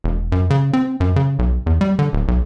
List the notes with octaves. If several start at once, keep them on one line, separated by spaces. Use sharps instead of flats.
E1
F#2
C#3
C4
F#2
C#3
B1
E2
G3
D3
D1
B1